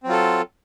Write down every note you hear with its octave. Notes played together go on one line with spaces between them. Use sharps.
F#3 C4 F4 A4